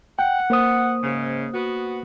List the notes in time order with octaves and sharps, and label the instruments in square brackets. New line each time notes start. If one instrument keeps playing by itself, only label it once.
[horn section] F#5 [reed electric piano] G5
[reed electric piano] A#3 C5 D#6
[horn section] G#2 C#3
B3 F#4